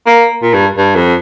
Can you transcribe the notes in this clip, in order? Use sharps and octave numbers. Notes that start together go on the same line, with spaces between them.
A#3
A#2
G2
G2
F2